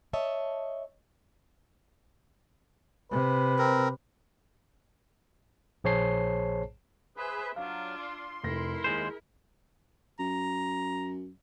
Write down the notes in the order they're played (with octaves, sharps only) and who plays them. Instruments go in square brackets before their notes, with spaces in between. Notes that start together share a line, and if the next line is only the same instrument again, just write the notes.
[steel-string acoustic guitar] C#5 D#5 E5 A5
[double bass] C3 [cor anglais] B4
[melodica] C4 A#4
[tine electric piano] A#1 G#4 C5 C#5 A5 C7
[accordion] G#4 B4 [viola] C5 E5
[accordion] F#3 [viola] D4 F4 [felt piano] F5
[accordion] C6
[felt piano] F1 A#6 [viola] E4 A#4
[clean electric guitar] D#2 G#3 C5 [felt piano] G#4
[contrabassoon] F#2 [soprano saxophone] A#5